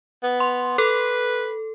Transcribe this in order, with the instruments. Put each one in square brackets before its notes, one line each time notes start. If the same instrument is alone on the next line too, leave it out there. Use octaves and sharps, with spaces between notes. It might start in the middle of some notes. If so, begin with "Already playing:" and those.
[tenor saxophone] B3
[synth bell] C6
[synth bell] A4 [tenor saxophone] B4